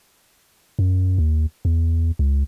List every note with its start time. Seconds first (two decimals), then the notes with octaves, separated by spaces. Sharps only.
0.79 F#2
1.18 D#2
1.65 E2
2.19 C#2